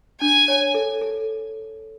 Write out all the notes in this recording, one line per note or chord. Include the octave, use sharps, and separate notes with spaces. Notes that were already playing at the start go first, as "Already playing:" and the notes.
D4 G#5
C#5
A4
A4